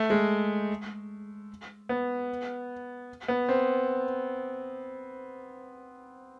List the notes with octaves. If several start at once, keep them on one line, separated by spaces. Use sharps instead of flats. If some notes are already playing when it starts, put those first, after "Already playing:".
Already playing: A3
G#3
B3
B3
C4